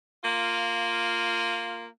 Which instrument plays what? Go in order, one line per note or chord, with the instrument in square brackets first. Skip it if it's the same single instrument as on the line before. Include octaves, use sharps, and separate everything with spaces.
[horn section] A#3 F4